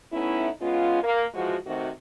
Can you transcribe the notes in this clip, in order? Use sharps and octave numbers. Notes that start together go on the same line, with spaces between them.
A3 B3 C#4 D#4 E4
G#3 B3 C#4 F4
A#3
E3 F3 G#3 F#4
C3 D#3 A3 C4 F#4